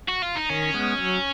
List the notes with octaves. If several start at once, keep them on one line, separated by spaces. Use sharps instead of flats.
F#4
F4
D#4
D#3 C#4
G#3 B3
F#3